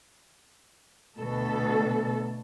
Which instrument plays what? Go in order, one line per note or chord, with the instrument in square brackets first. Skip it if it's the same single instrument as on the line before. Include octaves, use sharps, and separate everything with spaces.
[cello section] D2 B2 A4